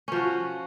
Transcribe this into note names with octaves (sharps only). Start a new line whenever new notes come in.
F3 C#4 F#4